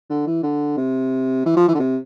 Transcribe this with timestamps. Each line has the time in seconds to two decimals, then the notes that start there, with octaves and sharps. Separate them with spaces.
0.10 D3
0.27 E3
0.43 D3
0.77 C3
1.46 E3
1.56 F3
1.68 E3
1.75 D3
1.80 C3